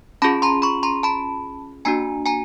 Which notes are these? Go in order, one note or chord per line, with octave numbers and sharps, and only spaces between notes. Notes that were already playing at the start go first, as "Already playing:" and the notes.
C#4 F4 G#4 A5 B5
A#5 C6
B5 C#6
A#5 C6
A5 B5
A#3 D4 F#4 G#5 A#5
G#5 A#5